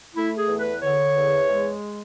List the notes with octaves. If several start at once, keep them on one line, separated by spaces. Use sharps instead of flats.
A3 E4
G#4
E2
B4
D3 C#5
E2
G#3